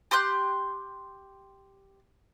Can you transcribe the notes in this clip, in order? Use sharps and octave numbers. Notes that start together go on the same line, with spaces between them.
G4 C6 F#6 G6